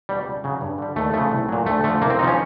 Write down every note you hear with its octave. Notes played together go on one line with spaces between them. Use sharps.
B2 G3
C#2
C#3 F#3
G2
D3 G3
D#2 A3
C#3 F3 A3
C2
A#2 F#3
D2 A3
D3 F3 A3
C2 A#3
C4
C3 F3 D#4
C#4